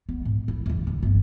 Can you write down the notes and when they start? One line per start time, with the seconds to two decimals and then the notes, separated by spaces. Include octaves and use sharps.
0.09 B3
0.25 G#2
0.48 E4
0.66 E2 C#3
0.87 D3
1.02 G1 C3